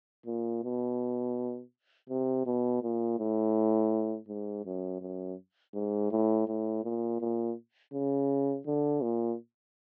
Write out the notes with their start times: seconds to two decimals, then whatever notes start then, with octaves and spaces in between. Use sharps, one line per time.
0.26 A#2
0.64 B2
2.09 C3
2.46 B2
2.83 A#2
3.19 A2
4.28 G#2
4.65 F#2
5.01 F#2
5.74 G#2
6.11 A2
6.47 A2
6.84 A#2
7.21 A#2
7.93 C#3
8.67 D3
9.03 A#2